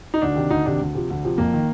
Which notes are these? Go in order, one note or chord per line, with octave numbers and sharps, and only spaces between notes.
D#4
D2 D4
C3 D#3
D2 D#4
C3 D#3 D4
D2
C3 F3
D2
C3 F3
F2 A#3
D#3